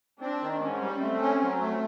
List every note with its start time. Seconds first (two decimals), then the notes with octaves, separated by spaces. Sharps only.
0.20 C4 D4
0.41 D#3
0.61 G#2 C#4
0.81 G3
1.01 A3 C4
1.21 C#4
1.41 F#3
1.61 A3